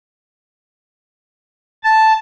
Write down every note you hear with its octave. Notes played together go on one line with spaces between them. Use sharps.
A5